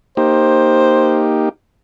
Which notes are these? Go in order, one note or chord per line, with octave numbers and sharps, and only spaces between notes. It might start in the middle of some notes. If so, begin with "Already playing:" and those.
A#3 D#4 G4 C5